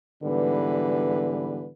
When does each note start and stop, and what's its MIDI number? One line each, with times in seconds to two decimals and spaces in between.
0.23 1.70 44
0.23 1.70 50
0.23 1.70 52
0.23 1.70 55
0.23 1.70 59
0.23 1.70 71